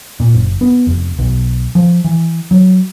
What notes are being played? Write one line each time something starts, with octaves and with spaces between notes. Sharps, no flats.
A#2
F#1
B3
F1
B1
F3
E3
F#3